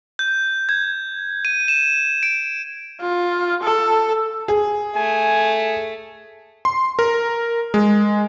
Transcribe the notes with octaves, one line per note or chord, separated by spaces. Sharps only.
G6
G#6
D#7
E7
D7
F4
A4
G#4
A3 G#5
C6
A#4
G#3